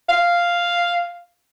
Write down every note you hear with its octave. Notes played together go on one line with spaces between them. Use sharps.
F5